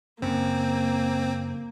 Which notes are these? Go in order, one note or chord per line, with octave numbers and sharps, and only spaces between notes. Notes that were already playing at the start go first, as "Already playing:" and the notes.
F#2 C#3 A#3 C4